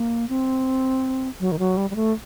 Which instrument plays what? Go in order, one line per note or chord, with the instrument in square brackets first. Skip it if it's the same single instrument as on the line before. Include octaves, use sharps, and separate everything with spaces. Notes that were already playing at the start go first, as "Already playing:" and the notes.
Already playing: [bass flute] A#3
C4
F#3
D#3
F#3
G3
G3
A3